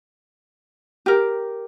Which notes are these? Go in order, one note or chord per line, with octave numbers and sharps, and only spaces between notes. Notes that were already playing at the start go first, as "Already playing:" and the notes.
G4 A#4